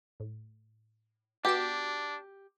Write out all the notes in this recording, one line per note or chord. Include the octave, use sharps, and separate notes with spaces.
A2
B3 D4 F#4 G4 E7